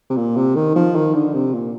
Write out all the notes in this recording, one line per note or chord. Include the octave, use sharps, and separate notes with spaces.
C3
A#2
C3
D#3
F3
D#3
D3
C3
A#2